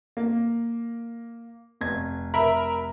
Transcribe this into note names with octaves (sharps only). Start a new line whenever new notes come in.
A#3
F1 G#6
A#4 E5 B5